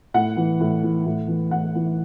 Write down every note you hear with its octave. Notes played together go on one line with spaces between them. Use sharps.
A2 F#5
E3
A2
E3
A2
E3
A2 F#5
E3